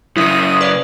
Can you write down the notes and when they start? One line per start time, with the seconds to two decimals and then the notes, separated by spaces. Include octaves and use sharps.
0.16 F#2 C#3 E4 E5 D#6
0.61 B4 D5 F5